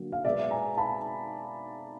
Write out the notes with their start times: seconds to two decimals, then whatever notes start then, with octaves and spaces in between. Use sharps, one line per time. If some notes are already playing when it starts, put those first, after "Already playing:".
Already playing: D3 F#3 A#3
0.12 F5
0.25 B2 G#3 B3 D5 E5
0.51 G#5 A#5
0.78 A5 B5